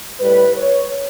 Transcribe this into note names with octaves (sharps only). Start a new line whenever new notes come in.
A2 G3 B4
C#5